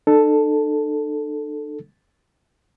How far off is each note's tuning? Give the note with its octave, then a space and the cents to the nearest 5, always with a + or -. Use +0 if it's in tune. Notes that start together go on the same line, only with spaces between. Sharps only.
D4 +45 A4 +0